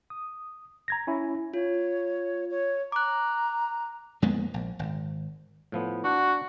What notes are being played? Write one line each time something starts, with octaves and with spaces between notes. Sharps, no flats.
D#6
A#5 G#6 A#6
C#4 E4
F4 C#5
C#5
A#5 D6 F#6
F2 G#3 A#3 B3
A#1
G#1
A2 F3 B3
D4 F#4 F#5